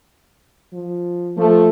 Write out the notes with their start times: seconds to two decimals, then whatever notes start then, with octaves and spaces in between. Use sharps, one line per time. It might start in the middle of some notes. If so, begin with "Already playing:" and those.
0.73 F3
1.37 F3 A3